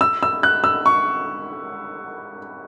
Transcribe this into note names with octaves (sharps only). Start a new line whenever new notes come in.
E6
E6
F#6
E6
C#6